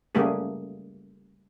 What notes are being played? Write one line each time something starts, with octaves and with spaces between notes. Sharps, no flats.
C#3 G3 A3 A#3 G4 G#4